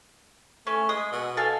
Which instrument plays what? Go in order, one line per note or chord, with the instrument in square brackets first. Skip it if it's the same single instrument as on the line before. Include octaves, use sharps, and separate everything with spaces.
[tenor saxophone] A3 [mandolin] C#4
[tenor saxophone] G#3 [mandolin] D#6
[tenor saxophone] B2
[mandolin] A4 F5 G#5